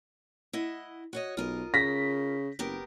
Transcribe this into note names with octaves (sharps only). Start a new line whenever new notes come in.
E4 D#5 F#5
F#4 C#5 D#5
B1 F4 A#4 D#5
C#3 A#6 B6
F#1 B3 G4 A#4